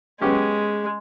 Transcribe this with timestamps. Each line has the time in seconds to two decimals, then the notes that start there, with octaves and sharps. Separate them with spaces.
0.21 G#3 B3 C#4 G4